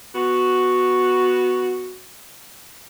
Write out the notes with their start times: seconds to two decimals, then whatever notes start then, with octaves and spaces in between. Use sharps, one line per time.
0.15 B3 F#4